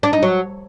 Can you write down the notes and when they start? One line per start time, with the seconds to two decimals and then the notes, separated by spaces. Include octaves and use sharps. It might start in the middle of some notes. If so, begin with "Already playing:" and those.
0.03 D4
0.13 D#4
0.23 F#3